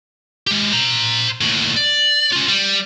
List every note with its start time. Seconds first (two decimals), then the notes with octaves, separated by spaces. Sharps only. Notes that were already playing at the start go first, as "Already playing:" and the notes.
0.47 G#3 G4
0.73 C5 A#5
1.41 D#2 A2
1.77 D5
2.33 C#4 F4
2.48 G3